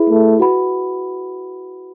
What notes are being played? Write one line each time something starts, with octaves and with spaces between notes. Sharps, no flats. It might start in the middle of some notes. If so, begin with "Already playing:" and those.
Already playing: E4 G#4 B4 E5 B5
A3
F#4 B4 F#5 B5